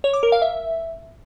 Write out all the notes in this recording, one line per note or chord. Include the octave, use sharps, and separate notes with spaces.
C#5
D6
A#4
F5
E5